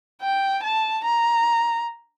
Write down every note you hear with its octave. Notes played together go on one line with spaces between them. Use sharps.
G5
A5
A#5